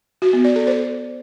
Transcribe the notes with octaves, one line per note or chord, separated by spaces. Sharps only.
F#4
B3
D5
A4
C5